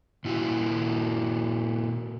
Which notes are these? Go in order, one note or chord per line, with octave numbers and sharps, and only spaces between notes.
A#2 E4 F#4